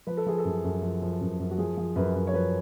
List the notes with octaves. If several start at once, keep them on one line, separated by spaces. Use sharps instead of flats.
F3 B4
A4
F3 G#4
A4
F#2
F#2
F3
F3
F#2
F#2
F#4
F3 G#4
F3
F#2 B4
F#2
C#5
F3 B4